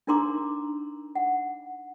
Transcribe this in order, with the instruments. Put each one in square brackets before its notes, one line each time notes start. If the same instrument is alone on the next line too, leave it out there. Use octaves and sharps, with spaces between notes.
[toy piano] D4 D#4 A#4 A#5 C6 D6
F#5